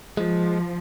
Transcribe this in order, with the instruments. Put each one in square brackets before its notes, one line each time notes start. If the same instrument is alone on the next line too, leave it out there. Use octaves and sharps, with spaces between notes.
[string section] F3 [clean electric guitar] G#3